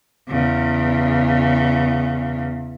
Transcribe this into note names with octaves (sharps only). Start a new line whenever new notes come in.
E2 C#3